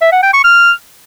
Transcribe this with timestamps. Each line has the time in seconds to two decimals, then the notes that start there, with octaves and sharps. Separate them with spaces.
0.02 E5
0.12 F#5
0.23 G5
0.34 C#6
0.44 F6